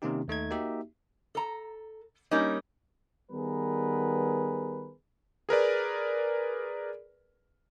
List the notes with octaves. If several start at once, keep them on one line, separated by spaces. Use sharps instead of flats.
C3 D#3 A#3 C#4 D#4 G4
D#2 A3 D#4 G#6
A#3 D#4 F#4 G4 E5
A4 A#5
G3 A#3 C#4 D#4
D#3 G3 B3 G#4 A#4 B4
G#4 A#4 B4 D5